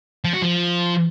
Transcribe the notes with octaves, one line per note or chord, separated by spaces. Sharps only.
F3
F#4
F3